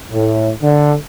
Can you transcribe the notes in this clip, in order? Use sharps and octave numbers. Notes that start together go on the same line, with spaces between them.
A2
D3